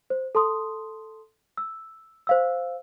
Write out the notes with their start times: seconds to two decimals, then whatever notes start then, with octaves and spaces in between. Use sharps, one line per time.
0.10 C5
0.35 A4 A5 C6 D#6
1.57 E6
2.27 C5 F5 E6